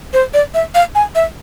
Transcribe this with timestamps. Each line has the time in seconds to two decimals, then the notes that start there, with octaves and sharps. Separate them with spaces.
0.14 C5
0.34 D5
0.54 E5
0.75 F5
0.95 G#5
1.15 E5